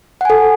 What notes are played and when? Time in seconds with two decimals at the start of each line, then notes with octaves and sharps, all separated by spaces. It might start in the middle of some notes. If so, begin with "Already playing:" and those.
0.21 F#5
0.25 G#5
0.30 A4